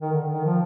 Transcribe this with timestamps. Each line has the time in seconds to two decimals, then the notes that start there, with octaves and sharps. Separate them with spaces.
0.02 D#3
0.12 D3
0.31 D#3
0.45 F3